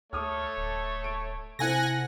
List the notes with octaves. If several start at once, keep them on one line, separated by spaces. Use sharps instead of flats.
D2 A3 A4 C#5 D6 D#6 F6
D1
D7
C3 C4 E4 A4 F#5 G#5 A#6